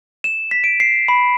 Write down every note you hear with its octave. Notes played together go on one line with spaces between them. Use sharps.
E7
B6
D7
C7
B5